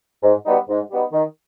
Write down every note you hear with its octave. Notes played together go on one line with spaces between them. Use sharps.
G#2
G3 B3 D#4
G#2
G3 B3 D#4
D#3